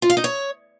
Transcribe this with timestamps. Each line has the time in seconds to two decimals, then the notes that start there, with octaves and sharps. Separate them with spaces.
0.02 F4
0.10 F5
0.17 D#4
0.24 C#5